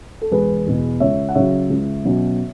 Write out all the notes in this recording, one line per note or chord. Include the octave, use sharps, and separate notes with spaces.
A4
E1 G#4 B4
E2 B2
C#2 C#5 E5
F#5
C#3 F#3 C#5 E5
C#2
B2 F#3 C#4